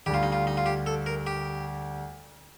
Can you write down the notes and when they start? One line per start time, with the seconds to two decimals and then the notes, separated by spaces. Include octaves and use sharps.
0.06 D2 D3 G3 G4
0.14 F4
0.23 D#4
0.32 F4
0.47 D#4
0.57 F4
0.66 G4
0.86 A4
1.06 A#4
1.27 G4